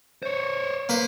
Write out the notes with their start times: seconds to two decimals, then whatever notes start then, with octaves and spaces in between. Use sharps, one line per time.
0.23 C5 C#5
0.89 A#3 B4 C5